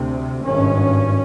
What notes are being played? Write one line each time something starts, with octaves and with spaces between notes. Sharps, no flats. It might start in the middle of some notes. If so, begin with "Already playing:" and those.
Already playing: D2 C3
G#1 G2 C#4